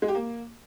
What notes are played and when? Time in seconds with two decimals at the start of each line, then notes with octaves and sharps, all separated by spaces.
0.02 G#3
0.08 G4
0.15 A#3